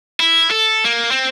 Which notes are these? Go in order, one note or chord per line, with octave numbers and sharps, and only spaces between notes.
E4
A4
A#3
C4